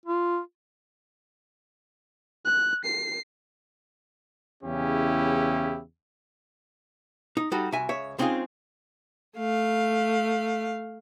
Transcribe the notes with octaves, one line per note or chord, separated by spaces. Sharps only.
F4
F#6
C7
E2 C#3 C#4 E4 G4
D#4
G3 D#4 F#4 A4
C2 F#4 E5 G#5
C#2 C#5 E5
G#3 C4 C#4 D#4 F4 G#4
A3 F5